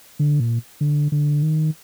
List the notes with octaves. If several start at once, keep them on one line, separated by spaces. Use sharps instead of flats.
D3
A#2
D3
D3
D#3